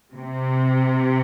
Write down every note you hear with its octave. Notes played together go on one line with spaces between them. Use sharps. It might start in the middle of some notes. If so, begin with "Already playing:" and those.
C3